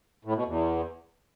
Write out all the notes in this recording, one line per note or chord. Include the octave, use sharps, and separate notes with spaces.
A2
B2
E2